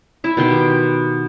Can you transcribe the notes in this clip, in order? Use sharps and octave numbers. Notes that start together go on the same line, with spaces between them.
E4 E5
B2 D#3 C6
G4